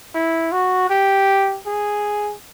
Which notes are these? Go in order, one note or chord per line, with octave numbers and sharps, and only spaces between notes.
E4
F#4
G4
G#4